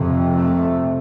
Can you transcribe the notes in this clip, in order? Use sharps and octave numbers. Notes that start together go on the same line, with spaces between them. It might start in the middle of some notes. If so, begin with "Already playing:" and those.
Already playing: F2 C3
A3